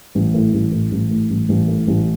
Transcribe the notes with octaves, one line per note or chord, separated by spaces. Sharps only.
A1
A2
A1
A2
A1
A2
A1
A1
A2
A1